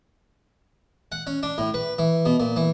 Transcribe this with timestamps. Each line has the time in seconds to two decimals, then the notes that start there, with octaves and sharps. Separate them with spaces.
1.12 F#5
1.27 C#4
1.43 D4
1.58 A2
1.74 B4
1.98 E3
2.25 B2
2.40 A#2
2.56 E3